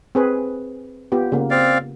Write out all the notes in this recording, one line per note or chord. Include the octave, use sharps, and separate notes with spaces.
C4 G#4 B4
B3 F4 G4
C#3 A#3
C4 D5 F5